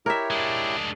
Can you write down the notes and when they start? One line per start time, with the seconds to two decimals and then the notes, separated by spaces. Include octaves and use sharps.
0.06 E4 G4 A#4 C#5 E5
0.31 G#3 D4